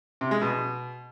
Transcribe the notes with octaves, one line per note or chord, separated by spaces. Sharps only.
C3
G#3
B2